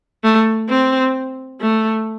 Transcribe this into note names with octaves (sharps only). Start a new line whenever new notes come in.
A3
C4
A3